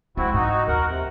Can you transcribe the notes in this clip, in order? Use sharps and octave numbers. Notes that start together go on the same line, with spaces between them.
G#3 C4 E4 F#4
G#2 D#4 F#4
D#2 F#4 A#4 F#5
C3